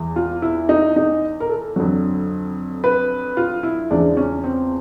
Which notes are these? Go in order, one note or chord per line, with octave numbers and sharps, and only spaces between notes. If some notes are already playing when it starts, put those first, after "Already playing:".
Already playing: E2 E3 G#3
F4
E4
D#4
D#4
A#4
A4
F2 D3 F#3
B4
F4
E4
E2 C#3 F3 G#3 D4
C#4
C4